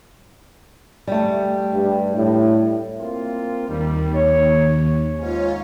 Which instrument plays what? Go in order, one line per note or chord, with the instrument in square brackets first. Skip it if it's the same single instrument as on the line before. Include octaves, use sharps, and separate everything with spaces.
[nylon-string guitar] G3 A3
[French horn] G2
A2
[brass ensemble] A#3 C4 F4
[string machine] D#2 [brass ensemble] D#3 G3
[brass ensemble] C#5
[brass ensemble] G#2 C#4 [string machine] F4 C#5